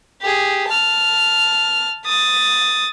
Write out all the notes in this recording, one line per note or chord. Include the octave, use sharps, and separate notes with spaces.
G4 G#4
A5 F6
D#6 A6